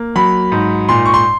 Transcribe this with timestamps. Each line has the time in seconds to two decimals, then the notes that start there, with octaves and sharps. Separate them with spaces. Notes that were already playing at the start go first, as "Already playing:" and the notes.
Already playing: A#3
0.16 F#3 B5
0.52 G#2
0.89 A#2 C6
1.06 C#6
1.14 C6